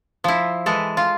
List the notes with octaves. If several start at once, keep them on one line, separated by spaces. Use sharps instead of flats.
F3 E4
E3 G#3 A4
F4